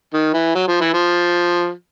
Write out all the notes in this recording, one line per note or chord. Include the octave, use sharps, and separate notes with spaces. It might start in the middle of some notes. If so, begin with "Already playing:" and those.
D#3
E3
F#3
F3
E3
F3